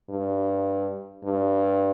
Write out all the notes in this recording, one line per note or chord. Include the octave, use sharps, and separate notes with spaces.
G2
G2